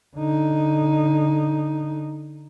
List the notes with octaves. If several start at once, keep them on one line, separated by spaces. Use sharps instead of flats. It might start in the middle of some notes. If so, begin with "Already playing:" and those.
D3 D#4